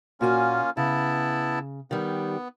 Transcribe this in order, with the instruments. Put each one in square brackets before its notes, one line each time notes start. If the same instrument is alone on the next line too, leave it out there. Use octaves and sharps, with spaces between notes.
[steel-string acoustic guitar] A#2 F#4 G#5 [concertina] A#3 C#4 F4
[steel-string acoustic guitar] C#3 [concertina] B3 E4 A5
[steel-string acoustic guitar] D#3 G3 [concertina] B3